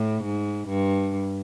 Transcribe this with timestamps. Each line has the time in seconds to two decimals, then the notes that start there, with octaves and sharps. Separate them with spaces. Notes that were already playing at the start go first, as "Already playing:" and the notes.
Already playing: A2
0.25 G#2
0.69 G2